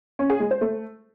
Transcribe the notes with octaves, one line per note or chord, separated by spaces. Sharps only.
C#4
G#4
G#3
C5
A3